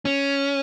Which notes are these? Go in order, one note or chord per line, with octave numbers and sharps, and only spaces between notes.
C#4